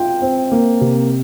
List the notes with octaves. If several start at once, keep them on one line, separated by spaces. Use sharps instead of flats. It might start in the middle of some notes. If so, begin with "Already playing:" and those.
Already playing: F4 G5
C4
A#3
C3